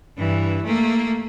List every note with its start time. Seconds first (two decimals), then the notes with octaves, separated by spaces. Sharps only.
0.17 G2 E3
0.64 A3 A#3